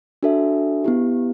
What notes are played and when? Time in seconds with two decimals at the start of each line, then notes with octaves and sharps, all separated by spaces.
0.23 D4 F#4 A4 E5
0.84 B3 E4 G4